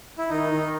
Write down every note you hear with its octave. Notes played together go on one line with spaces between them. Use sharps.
E4
D#3 D#4
D#3